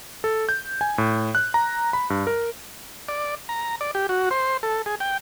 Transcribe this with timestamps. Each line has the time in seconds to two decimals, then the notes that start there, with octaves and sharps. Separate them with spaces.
0.24 A4
0.49 G6
0.81 G#5
0.98 A2
1.35 F#6
1.54 A#5
1.93 B5
2.10 G2
2.27 A#4
3.09 D5
3.49 A#5
3.81 D5
3.95 G4
4.09 F#4
4.31 C5
4.63 A4
4.86 G#4
5.00 G5